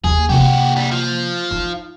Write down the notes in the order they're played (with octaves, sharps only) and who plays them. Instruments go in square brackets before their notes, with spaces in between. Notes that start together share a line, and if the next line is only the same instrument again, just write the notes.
[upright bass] D#2 A#3 [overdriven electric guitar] G#4
[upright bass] C3 A#3 [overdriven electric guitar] F#4 G4
[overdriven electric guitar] D2 G3
F3
[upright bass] D#4